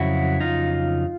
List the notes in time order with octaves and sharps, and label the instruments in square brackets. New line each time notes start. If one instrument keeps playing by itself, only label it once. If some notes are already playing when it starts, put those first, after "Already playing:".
Already playing: [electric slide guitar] F2 C#3 F#3 E4 F#4
D#4 F4